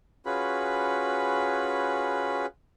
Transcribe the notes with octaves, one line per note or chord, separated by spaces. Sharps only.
C#4 F4 F#4 G#4 B4 B5